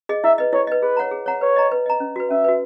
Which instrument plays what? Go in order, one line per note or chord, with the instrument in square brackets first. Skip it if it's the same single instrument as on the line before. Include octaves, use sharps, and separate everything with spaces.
[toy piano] G#4 D#5
[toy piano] E4 [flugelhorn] E5
[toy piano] B4 D#5
[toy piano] E4 [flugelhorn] C#5
[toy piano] B4 D#5
[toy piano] G#4 [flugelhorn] B4
[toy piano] C#5 F#5 A#5
G#4
C#5 F#5 A#5
[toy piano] B4 [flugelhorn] C#5
[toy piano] D#5 A#5
B4
D#5 A#5
C#4
F#4 B4
[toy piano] C#4 [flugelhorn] E5
[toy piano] F#4 B4